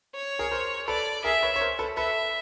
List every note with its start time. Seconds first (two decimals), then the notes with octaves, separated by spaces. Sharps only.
0.15 C#5
0.39 G#4 A#4
0.51 A#4 C5
0.88 A4 B4 D5
1.24 G#4 A#4 E5
1.42 B4 C#5
1.56 C#5
1.61 A#4 C5
1.79 A4 B4
1.97 A4 B4 E5